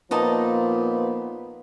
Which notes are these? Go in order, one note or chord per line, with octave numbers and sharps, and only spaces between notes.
A#2 F3 B3 D#4 D#5 A5